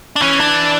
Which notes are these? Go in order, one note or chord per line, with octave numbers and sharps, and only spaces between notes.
D4
E3 C#4
D4